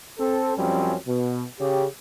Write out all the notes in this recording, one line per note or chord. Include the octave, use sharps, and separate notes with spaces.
C4 A4
F#2 F3 G3 C4 C#4
B2
C#3 G4